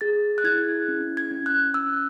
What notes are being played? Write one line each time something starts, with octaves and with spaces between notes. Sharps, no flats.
G#4 A6
F#6
E4 G#6
C#4
G#6
C#4
F#6
C#4 E6